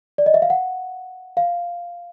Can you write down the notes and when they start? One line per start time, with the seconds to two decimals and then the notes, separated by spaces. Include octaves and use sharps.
0.18 D5
0.26 D#5
0.34 E5
0.42 F5
0.50 F#5
1.37 F5